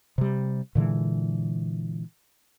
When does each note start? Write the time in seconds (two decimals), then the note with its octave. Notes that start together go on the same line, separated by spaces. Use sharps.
0.18 C3 G3
0.75 A#2 D3 E3 G#3